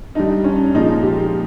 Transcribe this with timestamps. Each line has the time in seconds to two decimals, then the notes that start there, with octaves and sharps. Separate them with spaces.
0.15 G2 G3 D#4
0.44 C#4
0.74 A#2 F3 G#3 D#4
1.03 G4